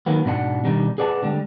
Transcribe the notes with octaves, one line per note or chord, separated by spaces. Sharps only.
D#3 F#3 A#3 B3
G#2 B2 D4 F4 F#5
B2 D#3 G3 D4 D#4
G#4 B4 D5 F#5 A5
D3 G3 G#3